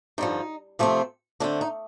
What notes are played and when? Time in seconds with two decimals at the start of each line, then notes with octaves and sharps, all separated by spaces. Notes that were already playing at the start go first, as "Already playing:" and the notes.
0.18 G2 D3 F3 D#4
0.79 C3 F3 A3 C4
1.40 D3 A3 C4 D4
1.61 D#4